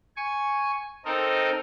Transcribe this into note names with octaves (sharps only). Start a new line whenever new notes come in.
G#5 C#6
C4 D#4 A4 A#4 D#5